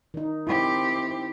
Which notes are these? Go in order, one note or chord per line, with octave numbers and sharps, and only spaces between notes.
D#3 D#4
C4 E4 G4